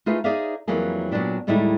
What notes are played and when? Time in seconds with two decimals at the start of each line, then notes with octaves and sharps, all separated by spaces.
0.06 A3 D#4 F4 G#4 B4
0.24 D#4 G#4 C5 D5 E5 F5
0.68 F2 E3 F#3 G3 A#3 G#4
1.11 A#2 F#3 B3 C4 D4 G4
1.47 D#2 A2 G3 G#3 D#4 E4